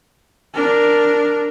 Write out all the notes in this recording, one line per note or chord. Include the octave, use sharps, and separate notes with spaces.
D4 A#4